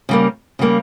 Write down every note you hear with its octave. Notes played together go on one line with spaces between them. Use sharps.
C#3 G3 A#3
C#3 G3 A#3